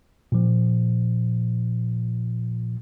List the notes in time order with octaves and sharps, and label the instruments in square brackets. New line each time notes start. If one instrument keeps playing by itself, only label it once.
[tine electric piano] A#2 F3